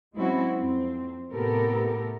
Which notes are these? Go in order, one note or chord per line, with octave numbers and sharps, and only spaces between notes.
F#3 G#3 C4 C#4 E4 F#4
F2 C4
A2 C3 B3 G4 A4 A#4